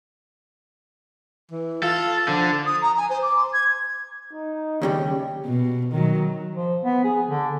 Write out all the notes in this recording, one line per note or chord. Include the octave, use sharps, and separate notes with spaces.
E3
F4 A4
D3 F3
D#6
A#5
G#5
C5
D6
C6
G#6
D#4
D#2 C#3 G3 G4
B2
D#3 F#3
F3
B3
G#4
D3